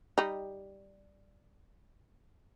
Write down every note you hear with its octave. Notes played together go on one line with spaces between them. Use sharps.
G3 D#4